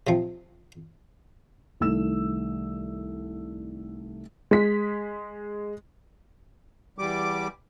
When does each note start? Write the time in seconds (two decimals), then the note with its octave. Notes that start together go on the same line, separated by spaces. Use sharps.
0.07 C3 F3
1.80 C2 D#3 A3 E6 E7
4.51 G#3 B6
6.99 E2 G3 D6